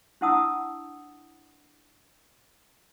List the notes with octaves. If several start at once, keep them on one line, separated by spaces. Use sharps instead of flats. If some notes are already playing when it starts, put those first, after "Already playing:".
D4 E4 F#5 A5 D#6 E6